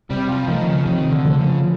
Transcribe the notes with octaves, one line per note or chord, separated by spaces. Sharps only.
C3 G3
F3
D#3 F3 A3
C#3
C3 D#3
D3
F3 A3
C#3